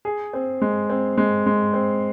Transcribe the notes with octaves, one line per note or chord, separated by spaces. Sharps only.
G#4
C4
G#3
C4
G#3
G#3
C4